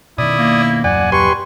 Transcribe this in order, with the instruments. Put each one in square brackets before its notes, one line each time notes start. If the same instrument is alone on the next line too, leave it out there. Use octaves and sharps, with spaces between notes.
[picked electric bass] B2 D#3 [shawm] E4 [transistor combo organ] D5 D#6
[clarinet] A#3
[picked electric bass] D#1 F#2 F#3 [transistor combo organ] D5 F#5 [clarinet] G#5
[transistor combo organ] G4 B4 C6 [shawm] C#6